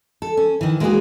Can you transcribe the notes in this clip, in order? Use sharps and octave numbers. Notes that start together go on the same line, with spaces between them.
A4
C#4
D#3 E3
G#3 A#3 D#4 E4 F#4 G#4